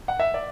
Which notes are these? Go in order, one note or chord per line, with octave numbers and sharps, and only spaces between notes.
F#5
E5
D5